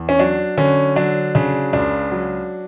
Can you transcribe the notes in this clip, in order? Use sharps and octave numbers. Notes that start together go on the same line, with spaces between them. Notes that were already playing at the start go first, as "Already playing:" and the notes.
Already playing: E2
C#4
F#3 D4
D3 C#4
F#3 D4
C#3 D4
C#2 D4
F#3